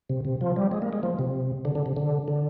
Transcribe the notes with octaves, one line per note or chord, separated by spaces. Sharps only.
C3
C3
F3
G3
G#3
A#3
G#3
F3
C3
D3
D3
C3
D3
D3